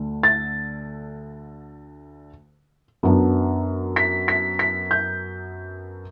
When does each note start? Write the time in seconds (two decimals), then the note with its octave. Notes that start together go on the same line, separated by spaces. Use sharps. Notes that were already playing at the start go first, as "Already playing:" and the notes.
Already playing: D2 D3
0.23 A6
3.03 F#2 F#3 B3 D4
3.96 B6
4.28 B6
4.59 B6
4.91 G6